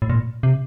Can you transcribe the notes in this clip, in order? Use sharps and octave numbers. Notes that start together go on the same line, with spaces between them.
A2
A#2
C3